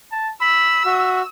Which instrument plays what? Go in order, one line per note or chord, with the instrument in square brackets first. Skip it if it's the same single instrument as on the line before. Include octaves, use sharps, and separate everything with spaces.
[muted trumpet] A5
[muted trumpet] B5 [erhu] E6
[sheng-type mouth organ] F#4 [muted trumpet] E5